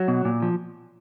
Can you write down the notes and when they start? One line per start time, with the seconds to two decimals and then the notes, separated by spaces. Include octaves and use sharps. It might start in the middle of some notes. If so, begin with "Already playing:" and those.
Already playing: F#3
0.08 B2
0.25 A#2
0.42 F3